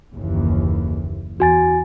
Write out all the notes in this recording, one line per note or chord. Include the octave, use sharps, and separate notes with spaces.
F#1 D#2 E3
E2 F#4 G#5 A6